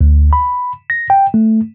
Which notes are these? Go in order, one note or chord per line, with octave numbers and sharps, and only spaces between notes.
D2
B5
A#6
G5
A3